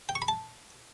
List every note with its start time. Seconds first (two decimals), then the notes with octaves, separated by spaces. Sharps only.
0.09 G5
0.15 C#6
0.22 B5
0.28 A5